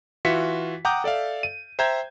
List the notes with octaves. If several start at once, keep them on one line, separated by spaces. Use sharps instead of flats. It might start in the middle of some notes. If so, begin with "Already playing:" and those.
E3 F4 F#4 E5 B6 C#7
F#5 G5 A#5 D6 D#6 G6
A4 D5 E5 F5
D#7
C5 E5 G5 A#5 G6 G#6